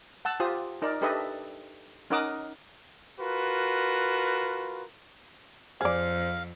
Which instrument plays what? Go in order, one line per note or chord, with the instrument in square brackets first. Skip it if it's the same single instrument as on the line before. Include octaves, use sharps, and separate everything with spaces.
[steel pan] F#5 A5 E6
F4 G4 C5 D#6
D#4 A#4 D5
D4 G4 A4 B4 D#5 E5
C#4 D#4 A#4 F#5 D6 D#6
[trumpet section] F4 F#4 A#4 B4
[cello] F2 [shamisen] G#4 D5 [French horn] C5 [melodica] F5